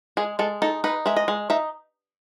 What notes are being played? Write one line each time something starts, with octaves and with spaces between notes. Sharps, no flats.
G#3 G#4
G#3 A4
D#4 A4
D#4 B4
G#3 E5
D#5
G#3
D#4 E5